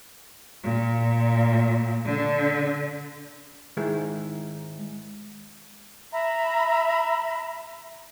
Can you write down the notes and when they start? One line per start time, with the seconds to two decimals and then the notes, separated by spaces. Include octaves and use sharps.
0.62 A#2
2.04 D3
3.77 G#2 D#3 G#3 E4
6.12 E5 A#5 B5